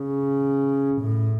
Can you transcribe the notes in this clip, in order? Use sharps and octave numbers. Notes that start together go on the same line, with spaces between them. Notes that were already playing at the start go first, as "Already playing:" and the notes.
Already playing: C#3
A2